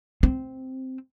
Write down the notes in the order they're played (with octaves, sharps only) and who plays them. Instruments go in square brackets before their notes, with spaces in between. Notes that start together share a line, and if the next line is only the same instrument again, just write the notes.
[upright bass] C4